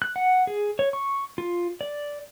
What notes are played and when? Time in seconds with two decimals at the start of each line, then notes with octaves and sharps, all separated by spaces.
0.02 F#6
0.16 F#5
0.47 G#4
0.79 C#5
0.93 C#6
1.38 F4
1.81 D5